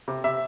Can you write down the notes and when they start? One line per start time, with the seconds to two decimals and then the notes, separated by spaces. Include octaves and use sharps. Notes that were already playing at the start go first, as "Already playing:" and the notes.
0.08 C3
0.24 C3 E5